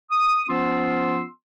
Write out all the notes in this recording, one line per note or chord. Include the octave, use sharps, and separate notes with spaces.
D#6
F3 B3 C#4 F4 C6 E6